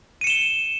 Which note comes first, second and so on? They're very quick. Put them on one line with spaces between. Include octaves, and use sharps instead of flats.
D#7 C#7 E7 G7